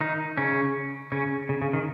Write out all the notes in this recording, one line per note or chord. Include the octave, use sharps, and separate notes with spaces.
D#3 D#4
C#3 C#4
C#3 C#4
C#3
C#3
D#3